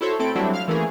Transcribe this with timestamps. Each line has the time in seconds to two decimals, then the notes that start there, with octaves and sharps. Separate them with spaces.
0.01 E4 F#4 A4 C5 C#5
0.19 A2 C4 E4 A4 D7
0.35 F#3 G3 A3 C4 D4 E4
0.53 F5 F6
0.68 E3 A3 A#3 C#4 G#4